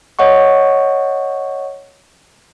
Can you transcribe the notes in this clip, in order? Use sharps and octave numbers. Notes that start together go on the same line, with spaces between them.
C#5 D#5 F#5 C#6